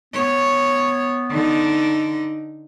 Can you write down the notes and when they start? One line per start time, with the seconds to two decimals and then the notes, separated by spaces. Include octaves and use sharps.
0.14 B3 C#5
1.31 D3 D#4